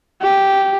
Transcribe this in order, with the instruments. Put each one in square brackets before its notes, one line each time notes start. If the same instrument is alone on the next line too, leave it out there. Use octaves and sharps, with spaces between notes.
[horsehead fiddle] G4